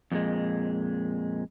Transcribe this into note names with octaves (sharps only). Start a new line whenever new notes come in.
F2 A#2 G#3